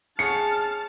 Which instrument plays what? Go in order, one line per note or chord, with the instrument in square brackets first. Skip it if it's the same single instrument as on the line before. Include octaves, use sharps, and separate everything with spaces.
[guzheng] G#4 C#5 F#5 [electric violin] A5 F6 [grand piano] C#7